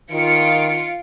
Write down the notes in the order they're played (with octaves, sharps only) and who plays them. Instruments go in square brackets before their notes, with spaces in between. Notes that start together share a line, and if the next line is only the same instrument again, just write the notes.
[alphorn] D#3 [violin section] F4 C#7 D7